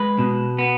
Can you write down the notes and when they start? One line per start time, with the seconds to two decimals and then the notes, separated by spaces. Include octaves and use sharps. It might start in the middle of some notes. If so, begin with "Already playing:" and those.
Already playing: G#3 B4
0.19 B2
0.59 B3